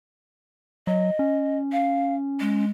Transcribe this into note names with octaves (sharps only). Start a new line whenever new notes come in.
F#3 D#5
C#4
F5
G#3